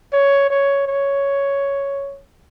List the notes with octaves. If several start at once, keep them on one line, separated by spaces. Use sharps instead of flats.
C#5
C#5
C#5